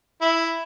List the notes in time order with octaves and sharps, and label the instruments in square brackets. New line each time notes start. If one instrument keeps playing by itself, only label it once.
[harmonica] E4